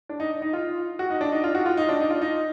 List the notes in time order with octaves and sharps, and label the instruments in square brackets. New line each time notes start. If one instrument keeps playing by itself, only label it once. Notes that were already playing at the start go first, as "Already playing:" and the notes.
[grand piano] D4
D#4
D#4
F4
F#4
D#4
D4
D#4
F4
F#4
F4
D#4
D4
D#4
F4
D#4